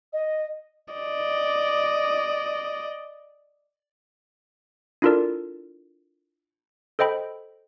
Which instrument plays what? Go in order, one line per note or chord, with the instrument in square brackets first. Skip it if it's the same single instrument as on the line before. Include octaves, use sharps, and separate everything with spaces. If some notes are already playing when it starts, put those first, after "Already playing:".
[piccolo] D#5
[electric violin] D5 D#5
[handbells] D4 E4 F4 A4 A#4 D5
A4 C5 D#5 G5 B5